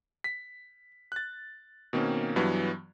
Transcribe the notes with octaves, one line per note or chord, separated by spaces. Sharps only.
B6
F#6 A6
B2 D#3 A#3 C4 C#4
G2 E3 F#3 B3